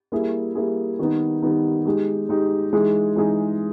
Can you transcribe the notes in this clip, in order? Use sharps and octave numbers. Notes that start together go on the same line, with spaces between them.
G3 A#3 E4 G#4
G3 A#3 E4 G#4
D#3 G3 B3 D#4
D#3 G3 B3 D#4
G#3 D#4 G4
G#3 D#4 G4
E3 G#3 D#4 G#4
E3 G#3 D#4 G#4